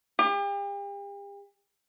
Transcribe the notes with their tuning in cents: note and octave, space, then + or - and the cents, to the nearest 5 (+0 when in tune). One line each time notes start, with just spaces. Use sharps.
G4 +40